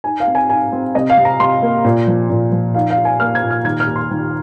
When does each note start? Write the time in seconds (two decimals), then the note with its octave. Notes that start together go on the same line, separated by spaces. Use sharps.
0.04 D#4 G#5
0.20 F5
0.27 C4
0.35 G#5
0.50 D#4 G#5
0.72 C4
0.95 C3 D#5
1.10 F5
1.17 C3
1.25 A#5
1.40 C3 C6
1.62 A#3
1.85 A#2
2.07 F3
2.30 A#2
2.52 F3
2.75 D#4 F5
2.90 F5
2.98 D#4
3.05 G#5
3.20 A#3 F6
3.35 G#6
3.43 A#2
3.51 F6
3.65 D#3 G#6
3.80 F6
3.87 D#2
3.96 C6
4.11 D#3